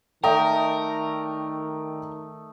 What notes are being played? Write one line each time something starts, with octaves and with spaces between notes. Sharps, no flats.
D#3 A3 A#4 D5 D#5 G5